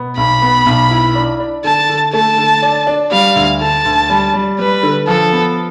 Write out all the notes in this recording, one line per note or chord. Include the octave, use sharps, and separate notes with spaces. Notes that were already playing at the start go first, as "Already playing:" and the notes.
Already playing: B2 B3
B1 B5
B3
B1
E4
D4
D4
D3 A5
D3
A3 A5
D3
D4
D4
G3 F5
D2
D3 A5
D2
G3
G3
G3 B4
D3
F3 A4
B3